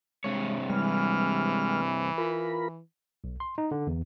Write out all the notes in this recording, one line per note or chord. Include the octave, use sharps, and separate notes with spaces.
G2 C3 G#3 C#5
E3 G3 G#3 F6
F4 A#4 B5
B1
C6
D#4
D3
E2